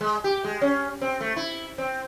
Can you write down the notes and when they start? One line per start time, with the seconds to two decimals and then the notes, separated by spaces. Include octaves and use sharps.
0.01 G#3
0.24 G4
0.44 G#3
0.61 C#4
1.01 C4
1.21 A3
1.36 E4
1.78 C4